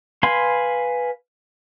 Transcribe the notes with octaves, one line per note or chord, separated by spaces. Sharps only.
B4 F5 G#5 B5 C6